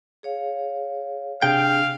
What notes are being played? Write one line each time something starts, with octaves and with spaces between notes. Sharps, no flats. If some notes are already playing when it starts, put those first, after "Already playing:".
G#4 C#5 F5
C3 D4 G#4 F5 G5